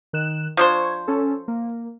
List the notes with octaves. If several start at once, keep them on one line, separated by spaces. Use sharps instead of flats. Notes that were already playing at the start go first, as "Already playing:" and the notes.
D#3 F#6 E7
F3 D4 C5 C#6 G#6
C#4 A4
A#3